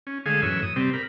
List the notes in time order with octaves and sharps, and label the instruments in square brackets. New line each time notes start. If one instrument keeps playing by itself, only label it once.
[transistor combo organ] C#4
D3 G#3 A3 G#4 F5 G#5
F#2 A2 E3 C#5 E6
D#6
C3 G3 C4
A#4 B5